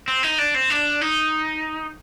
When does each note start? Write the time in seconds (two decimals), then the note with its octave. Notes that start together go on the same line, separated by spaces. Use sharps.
0.08 C4
0.23 D#4
0.38 D4
0.54 C4
0.70 D4
1.01 D#4